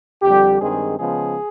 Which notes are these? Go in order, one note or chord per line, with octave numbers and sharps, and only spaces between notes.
F2 D3 G3 G4
G2 D#3 G#3 C4 G#4
C#3 F3 G#3 B3 G#4